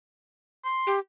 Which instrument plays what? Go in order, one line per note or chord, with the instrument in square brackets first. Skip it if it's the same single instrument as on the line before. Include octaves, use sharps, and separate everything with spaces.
[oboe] C6
[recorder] G4